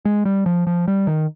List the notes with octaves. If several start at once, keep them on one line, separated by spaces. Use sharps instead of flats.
G#3
G3
F3
F3
G3
D#3